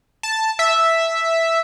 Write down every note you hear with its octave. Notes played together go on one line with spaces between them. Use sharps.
A5
E5